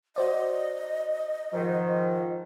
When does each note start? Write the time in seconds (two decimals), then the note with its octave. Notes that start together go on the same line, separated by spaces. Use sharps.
0.16 F#4 C5 D5 D#5
1.53 G#2 D#3 F3